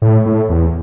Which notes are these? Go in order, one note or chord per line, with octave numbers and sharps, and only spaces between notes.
A2
A2
E2